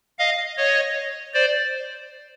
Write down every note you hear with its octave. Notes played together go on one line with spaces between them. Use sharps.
D#5 F5
C#5 D#5
C5 D5